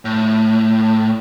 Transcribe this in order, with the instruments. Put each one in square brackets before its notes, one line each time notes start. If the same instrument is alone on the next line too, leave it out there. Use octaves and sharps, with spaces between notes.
[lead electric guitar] A2